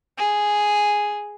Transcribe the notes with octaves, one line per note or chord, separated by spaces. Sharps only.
G#4